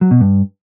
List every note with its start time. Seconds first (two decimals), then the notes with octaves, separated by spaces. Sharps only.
0.01 F#3
0.11 B2
0.21 G2